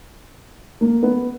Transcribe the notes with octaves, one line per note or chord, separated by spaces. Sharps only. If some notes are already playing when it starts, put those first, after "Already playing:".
A#3
B3